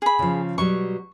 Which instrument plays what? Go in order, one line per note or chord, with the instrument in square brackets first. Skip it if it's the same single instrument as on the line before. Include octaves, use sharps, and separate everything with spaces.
[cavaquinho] G#4 B5
[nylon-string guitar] C#3 F3
[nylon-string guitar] B2 F#3 G3 [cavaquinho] C#6